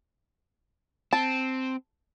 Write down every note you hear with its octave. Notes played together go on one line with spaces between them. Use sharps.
C4 A5